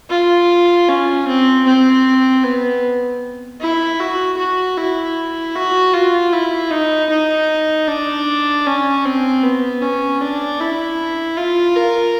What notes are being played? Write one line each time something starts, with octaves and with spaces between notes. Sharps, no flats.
F4
C#4
C4
C4
B3
E4
F#4
F#4
E4
F#4
F4
E4
D#4
D#4
D4
C#4
C4
B3
C#4
D4
E4
F4
A#4